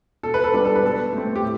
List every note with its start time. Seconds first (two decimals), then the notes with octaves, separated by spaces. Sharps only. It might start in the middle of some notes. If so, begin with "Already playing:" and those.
0.23 B2 A4
0.34 B4
0.44 A4
0.53 G3 B3 D4 B4
0.65 A4
0.76 B4
0.83 B2 A4
1.13 A3 C4
1.36 G4
1.42 A2